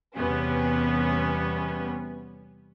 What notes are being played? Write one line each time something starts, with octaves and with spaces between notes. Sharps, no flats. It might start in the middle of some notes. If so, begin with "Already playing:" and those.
E2 C3 G3 B3 C#4